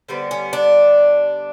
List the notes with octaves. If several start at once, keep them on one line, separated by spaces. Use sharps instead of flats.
D3 G3 B3 C4
C#4
D4